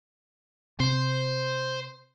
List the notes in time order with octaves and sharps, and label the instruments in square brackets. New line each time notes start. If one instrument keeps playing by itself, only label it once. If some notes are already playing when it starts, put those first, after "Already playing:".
[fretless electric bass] C3 [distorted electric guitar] C5